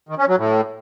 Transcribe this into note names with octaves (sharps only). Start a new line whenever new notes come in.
D#3
C#4
F#3
A2